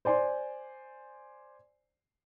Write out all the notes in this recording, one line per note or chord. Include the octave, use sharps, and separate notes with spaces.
C5 D5 G#5 C6